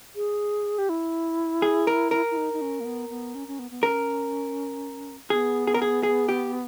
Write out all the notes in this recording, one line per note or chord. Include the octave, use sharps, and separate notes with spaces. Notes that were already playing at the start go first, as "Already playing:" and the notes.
G#4
G4
E4
G#4
A#4
A#4
E4
D#4
D#4
C#4
A#3
B3
B3
C#4
C#4
B3
B3
C#4 A#4
B3 G#4
G#4
A#4
G#4
G#4
G4